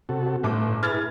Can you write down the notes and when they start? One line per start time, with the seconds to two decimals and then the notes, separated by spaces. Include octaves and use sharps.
0.09 C3 F#4 A4
0.43 G1 A2 D6
0.83 E4 G#4 B4 F6 G#6 A6